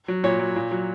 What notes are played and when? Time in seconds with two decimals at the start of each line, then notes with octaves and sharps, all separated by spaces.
0.08 F#3
0.24 A#2 C#5
0.40 F#3
0.56 A#2
0.71 F#3